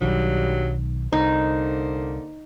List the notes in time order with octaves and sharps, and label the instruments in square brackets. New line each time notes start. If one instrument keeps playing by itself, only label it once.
[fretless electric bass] B1 D#3 [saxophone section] G2 F#3 G3
[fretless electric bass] C2 [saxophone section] D3 A#3 C5 [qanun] D#4